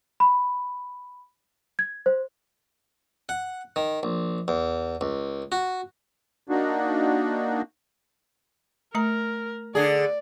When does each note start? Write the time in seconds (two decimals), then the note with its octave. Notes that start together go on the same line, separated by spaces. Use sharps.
0.20 B5
1.79 G#6
2.06 C5
3.29 F#5
3.76 D#3
4.03 A#1
4.48 E2
5.01 C#2
5.52 F#4
6.49 A#3 D4 D#4 F#4
8.95 A3 A#4 A#5
9.75 D3 G#4 D5